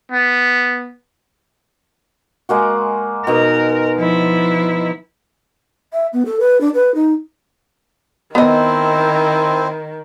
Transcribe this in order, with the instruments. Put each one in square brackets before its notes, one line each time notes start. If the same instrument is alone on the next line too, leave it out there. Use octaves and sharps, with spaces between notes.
[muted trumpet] B3
[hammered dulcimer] G#3 A#3 F#4
[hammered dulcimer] B2 D#4 [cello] A#4
[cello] F3 E4
[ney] E5
B3
A4
B4
D4
B4
D#4
[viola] D#3 [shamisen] B3 D#5 [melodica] C4 E4 C5